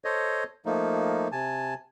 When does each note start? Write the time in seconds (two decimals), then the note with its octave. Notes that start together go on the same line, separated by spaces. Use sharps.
0.05 A4 C5 C#5 D#5
0.66 F3 A3 A#3 D#4
1.32 C3 G#5 A5